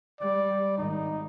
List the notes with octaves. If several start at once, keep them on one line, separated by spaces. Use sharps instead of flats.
G3 D5
G#1 D#4